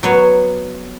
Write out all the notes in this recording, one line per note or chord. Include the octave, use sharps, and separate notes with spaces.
F#3 B3 C#5